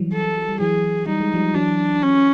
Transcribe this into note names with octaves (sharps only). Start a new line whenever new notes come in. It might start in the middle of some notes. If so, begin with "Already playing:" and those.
Already playing: E3 F#3 G3
A4
G3
E3 F#3 G#4
G3 D#4
G#3
F3 G3
E3 F#3 D4
C#4